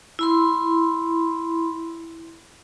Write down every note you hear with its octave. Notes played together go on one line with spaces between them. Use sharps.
E4 B5 C6